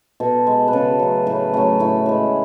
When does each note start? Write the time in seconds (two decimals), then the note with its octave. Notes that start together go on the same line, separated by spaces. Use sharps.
0.20 B2 A4
0.47 G#3
0.68 B4
0.73 C#3 A4
1.00 F#3 A3
1.27 A2 B4
1.54 F#3 A3 C#4
1.80 A2 E4
2.06 E3 G#3